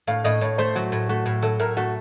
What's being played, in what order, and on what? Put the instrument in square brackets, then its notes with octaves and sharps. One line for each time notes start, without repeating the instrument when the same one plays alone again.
[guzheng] A2 [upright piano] F5
[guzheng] A2 [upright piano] D#5
[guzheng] A2 [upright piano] C#5
[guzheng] A3 [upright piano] C5
[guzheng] F#3 [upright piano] F#4
[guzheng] A2
[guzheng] A3 [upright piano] F#4
[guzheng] A2
[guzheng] F#3 [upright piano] A4
[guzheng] A2 [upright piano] A#4
[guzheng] A3 [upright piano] F#4